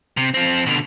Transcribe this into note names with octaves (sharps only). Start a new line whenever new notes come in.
C3
F3 C4
B2 D3